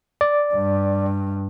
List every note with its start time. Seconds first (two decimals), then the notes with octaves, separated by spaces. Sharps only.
0.21 D5
0.54 G2